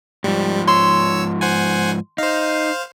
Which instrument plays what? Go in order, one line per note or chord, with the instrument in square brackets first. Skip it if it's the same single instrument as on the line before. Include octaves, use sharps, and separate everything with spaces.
[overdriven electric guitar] G#2 F3 [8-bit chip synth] G3
[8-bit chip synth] C#5 E6 [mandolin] C6
[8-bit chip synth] C5 F#5 G#5
[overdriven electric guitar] D#4 [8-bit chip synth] C5 F5